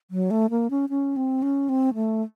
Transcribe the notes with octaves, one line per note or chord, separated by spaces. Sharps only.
F#3
A3
A#3
C#4
C#4
C4
C#4
C4
A3